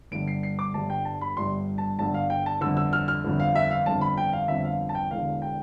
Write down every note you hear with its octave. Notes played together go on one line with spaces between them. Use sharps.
G1 G2 D3 G3 D7
C7
C7
D6
G1 G2 D3 G3 A5
G5
A5
B5
G1 G2 D3 G3 C6
A5
G1 G2 D3 G3 A5
F5
G5
A5
G1 F2 D3 E6
E6
F6
F6
G1 F2 D3
F5
E5
F5
G1 F2 D3 A5
B5
G5
F5
G1 F2 D3 E5
F5
A5
G5
E1 E2 D3 F5
G5